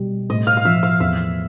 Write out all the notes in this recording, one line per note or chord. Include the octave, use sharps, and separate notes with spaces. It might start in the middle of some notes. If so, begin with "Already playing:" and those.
Already playing: B2 G3
A2 D#5
F5
F5
F3 E5
F5
E2 E5